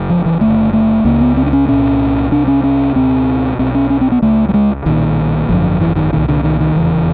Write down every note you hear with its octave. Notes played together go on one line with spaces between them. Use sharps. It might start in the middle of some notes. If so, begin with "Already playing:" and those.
Already playing: F#1 F#2 C#3
F3
E3
F#1 F2 D3 A3
A3
C#2 C#3 A#3
B3
C4
D4
C#4
C2 A#2 C#4
C2 C3 D4
C#4
C#4
C#2 B2 C4
B1 B2 C4
C#4
C#4
C4
B3
C#2 C#3 A3
G3
G#3
B1 A#2 D#3
G#1 F#2 D3 F3
E3
D#3
C2 A#2 D#3
D3
D#3
D#3
F1 E2 C#3 E3